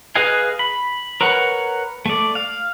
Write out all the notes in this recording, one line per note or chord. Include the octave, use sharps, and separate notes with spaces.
G#4 B4 D#5 F5 G#5
B5
A#4 B4 C#5 F#5
A3 D5
F5